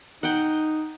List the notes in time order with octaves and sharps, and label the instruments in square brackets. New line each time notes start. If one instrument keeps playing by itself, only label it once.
[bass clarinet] D#4 [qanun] F#5 G5